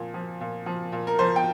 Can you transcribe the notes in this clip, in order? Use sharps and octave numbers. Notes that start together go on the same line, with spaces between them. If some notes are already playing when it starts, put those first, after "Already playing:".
Already playing: A#2 F3
F3
A#2
F3
A#2
A#4
F3 C5
G5